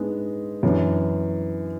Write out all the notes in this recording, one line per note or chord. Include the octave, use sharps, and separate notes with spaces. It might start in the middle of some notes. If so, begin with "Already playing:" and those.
Already playing: G#2 G#3 B3 D4
F#2 E3 B3 D4